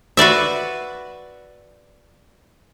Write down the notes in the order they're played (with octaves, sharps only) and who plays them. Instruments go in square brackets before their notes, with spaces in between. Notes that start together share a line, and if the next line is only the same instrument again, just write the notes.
[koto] F#4 B4 D5 E5